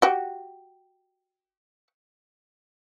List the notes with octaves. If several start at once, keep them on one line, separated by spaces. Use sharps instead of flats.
F#4 G4